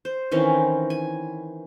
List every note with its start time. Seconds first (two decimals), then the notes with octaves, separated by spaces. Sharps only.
0.05 C5
0.31 D#3 E3 C4 C#4
0.90 G#5